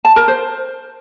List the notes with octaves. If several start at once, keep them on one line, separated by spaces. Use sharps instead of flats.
A5
A#4
C5